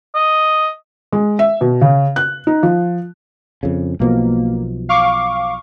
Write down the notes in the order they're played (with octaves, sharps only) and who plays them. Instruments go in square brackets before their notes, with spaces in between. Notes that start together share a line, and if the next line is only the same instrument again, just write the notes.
[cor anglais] D#5
[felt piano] G#3
E5
B2
C#3
F#6
D#4
F3
[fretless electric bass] F2 C#3
[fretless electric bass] B1 B2 F3 [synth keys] A#3
[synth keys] F5 C#6 D6